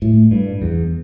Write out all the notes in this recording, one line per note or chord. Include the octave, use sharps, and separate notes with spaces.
A2
G2
E2